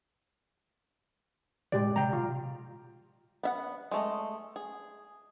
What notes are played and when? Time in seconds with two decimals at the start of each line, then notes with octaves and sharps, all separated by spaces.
1.72 A2 G#3 G4 D5
1.96 C3 G5 A#5
2.13 B2 F4
3.43 B3 E5 F#5
3.91 G#3 A3 D#5
4.56 G#4